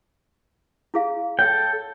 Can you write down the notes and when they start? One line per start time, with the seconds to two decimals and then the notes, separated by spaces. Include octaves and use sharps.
0.94 E4 G#4 F5
1.39 A4 C#5 G5